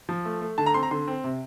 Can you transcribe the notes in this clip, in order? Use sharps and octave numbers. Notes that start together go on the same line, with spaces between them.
F3
A3
A3
D3 A5
A#5
C4 C6
A#5
D3 C6
C4
C3